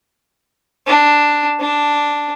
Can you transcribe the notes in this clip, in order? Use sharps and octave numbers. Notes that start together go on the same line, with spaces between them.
D4
D4